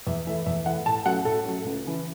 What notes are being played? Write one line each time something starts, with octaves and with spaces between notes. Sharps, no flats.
E2 E5
E3 A3 E5
E2 E5
E3 A3 F#5
A2 A5
F#3 A3 C#4 F#5
A2 A4
F#3 A3 C#4
C#2
C#3 E3